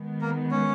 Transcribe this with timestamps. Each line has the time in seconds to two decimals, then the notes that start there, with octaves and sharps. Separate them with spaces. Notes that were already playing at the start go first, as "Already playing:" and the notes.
Already playing: D#3 G#3 B3
0.21 A#3 A#4
0.51 C#4 C#5